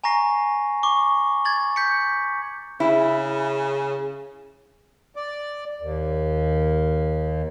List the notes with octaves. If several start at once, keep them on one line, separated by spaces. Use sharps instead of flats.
G#5 A#5 C#6 A#6 C7
C#6 D6
G#6 A6 F#7
G6 B6 C#7
C#3 E4
D5
D#2